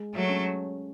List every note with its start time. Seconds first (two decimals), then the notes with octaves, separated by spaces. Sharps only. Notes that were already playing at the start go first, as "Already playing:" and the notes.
Already playing: G#3
0.14 F#3 A3
0.29 C#4